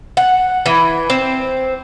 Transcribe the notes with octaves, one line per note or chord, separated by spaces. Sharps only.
F#5
E3
C4